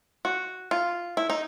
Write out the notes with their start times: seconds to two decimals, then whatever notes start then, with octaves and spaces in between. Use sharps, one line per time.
0.25 F#4
0.71 F4
1.17 E4
1.30 D#4